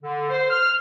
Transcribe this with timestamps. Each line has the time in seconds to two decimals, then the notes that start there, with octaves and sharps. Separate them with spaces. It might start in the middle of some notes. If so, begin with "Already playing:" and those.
0.04 D3
0.30 C5
0.50 F6